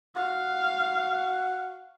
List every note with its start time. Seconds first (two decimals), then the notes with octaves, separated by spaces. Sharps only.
0.16 F#4 F5